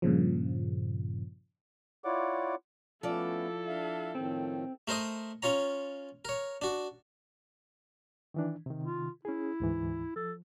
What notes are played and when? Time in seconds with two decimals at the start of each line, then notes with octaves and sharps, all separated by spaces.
0.02 G2 A#2 C#3 F3
2.04 E4 F4 C#5 D5 F#5 D6
3.03 F3 A3 B3 C#4 E4 A4 D5
3.68 D4 E5 F5
4.15 A2 D#3 F3 C4
4.88 A3 A#4 C5 D#5 D#6
5.42 C#4 F4 C#5 A#5
6.25 A#4 C#5
6.62 D4 F#4
8.34 D#3 E3 D4
8.66 C3 D#3
8.84 F4
9.25 C#4 E4 G#4
9.60 D2 G#2 E3
10.16 F3 A4